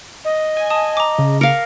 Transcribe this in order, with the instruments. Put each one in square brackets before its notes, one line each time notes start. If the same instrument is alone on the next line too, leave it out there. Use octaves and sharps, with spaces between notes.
[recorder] D#5
[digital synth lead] G#5
[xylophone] A5 D#6
A#5 D6
[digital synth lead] C#3
[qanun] A#4 F5 [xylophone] C#7